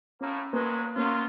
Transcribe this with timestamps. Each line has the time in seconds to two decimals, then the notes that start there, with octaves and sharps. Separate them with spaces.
0.21 A2 A#3 C#4
0.53 G2 F#3 G#3 A#3 B4
0.96 F#2 F#3 A#3 C#4 F4